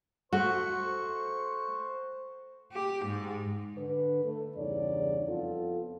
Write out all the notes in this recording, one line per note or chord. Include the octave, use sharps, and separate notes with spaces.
A3 F#4 C5 C#6
G4
G#2
D3 B4
A3
E2 G2 C#3 D#4 C#5 D5
F2 B3 F4 A4